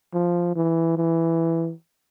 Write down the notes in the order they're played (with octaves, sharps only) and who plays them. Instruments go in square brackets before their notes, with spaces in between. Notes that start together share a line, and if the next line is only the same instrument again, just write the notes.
[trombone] F3
E3
E3